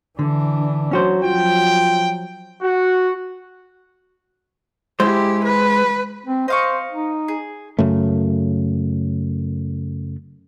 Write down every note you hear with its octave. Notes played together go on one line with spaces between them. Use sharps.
D3 E3 D4
F#3 C#4 F#4 C5
F3 F#3 F4 G5
F#4
G#3 E4 G4 C5
B4
C4
C5 D#5 F5 C#6
D#4
G#4
F#2 C#3 A3